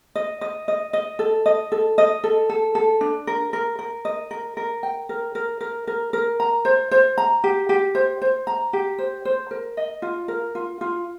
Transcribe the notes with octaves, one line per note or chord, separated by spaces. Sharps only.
D#5
D#5
D#5
D#5
A4
D#5
A4
D#5
A4
A4
A4
D4
A#4
A#4
A#4
D#5
A#4
A#4
G5
A#4
A#4
A#4
A#4
A#4
A#5
C5
C5
A#5
G4
G4
C5
C5
A#5
G4
C5
C5
A#4
D#5
F4
A#4
F4
F4